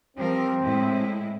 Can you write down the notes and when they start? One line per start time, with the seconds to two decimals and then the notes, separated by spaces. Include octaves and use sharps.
0.17 F3 G3 C4 A#4
0.63 A2 G#3 E4